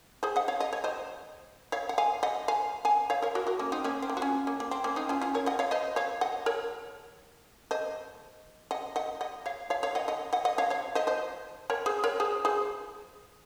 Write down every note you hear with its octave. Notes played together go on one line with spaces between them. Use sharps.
G#4 C5
D#5 F#5
C#5 F5
D#5
C#5
C5 D#5
C#5 F5
F#5
F5 G#5
D#5 F#5
F5 G#5
F5 G#5
C#5 F5
A#4 C#5
F#4 A#4
F#4 A#4
A#3 C#4
C4 D#4
A#3 C#4
C4
A#3
F#4
C#4 F4
A#3 C#4
A#3
C4
A#3 C#4
C4 D#4
C#4 F4
C#4 F4
A#4 C#5
D#5 F#5
C#5 F5
C5 D#5
C#5 F5
D#5 F#5
A#4 C#5
C5 D#5
D#5 F#5
D#5 F#5
D#5 F#5
C#5 F5
C#5 F5
C#5 F5
D#5 F#5
D#5 F#5
D#5 F#5
D#5 F#5
C#5 F5
C#5 F5
C5 D#5
C5 D#5
A#4 C#5
G#4 C5
A#4 C#5
G#4 C5
G#4 C5